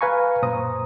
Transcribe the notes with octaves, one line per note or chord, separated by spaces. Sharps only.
B4 F5 G#5 A#5 C#6
F#2 A#2 C5 A#5 D#6